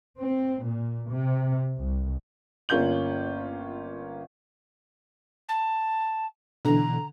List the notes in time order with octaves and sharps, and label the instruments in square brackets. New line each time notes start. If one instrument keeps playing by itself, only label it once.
[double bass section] C4
A#2
C3
C2
[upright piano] G1 A#3 C#4 F4 G6 F#7
[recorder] A5
[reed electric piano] B2 E3 [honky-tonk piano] D3 [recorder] A#5